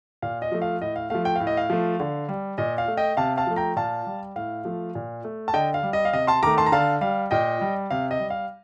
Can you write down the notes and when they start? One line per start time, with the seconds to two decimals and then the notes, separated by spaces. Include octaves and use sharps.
0.22 A#2 F5
0.42 D#5
0.52 F3 A3
0.62 F5
0.81 A2 D#5
0.96 F5
1.10 F3 A3 F5
1.25 G5
1.36 A2 F5
1.47 D#5
1.57 F5
1.70 F3 A3
2.00 D3
2.29 G3
2.58 A#2 D#5
2.78 F5
2.88 A3
2.97 D#5 G5
3.17 C3 F5 A5
3.37 F5 A5
3.47 F3 A3
3.56 G5 A#5
3.76 A#2 F5 A5
4.07 G3
4.36 A2 F5
4.65 F3 A3
4.95 A#2
5.24 A3
5.48 A5
5.54 D3 D#5 G5
5.74 F5
5.83 G3
5.93 D#5
6.05 F5
6.13 C3 D#5
6.27 A5 C6
6.43 D#3 A3 A#5 D6
6.58 A5 C6
6.66 A#5
6.72 D3 F5 A5
7.01 G3 F5
7.31 A#2 D#5 G5
7.61 G3
7.90 C3 F5
8.11 D#5
8.20 G3
8.30 F5